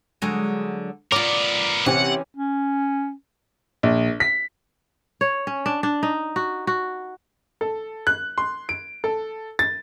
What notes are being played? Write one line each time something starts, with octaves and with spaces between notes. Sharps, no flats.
D3 F#3 G#3
B3 F4 A#4 D5 D6
C3 E3 C4 C#4 F#5
C#4
A#1
B6
C#5
C#4
D4
D4
D#4
F#4
F#4
A4
F#6
C6
D7
A4
A6